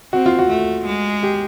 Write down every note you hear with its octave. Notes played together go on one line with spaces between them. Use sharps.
C4 F#4
F4
F#4
A3
G#3
G4